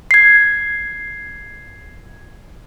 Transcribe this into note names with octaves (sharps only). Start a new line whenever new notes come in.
G#6 C7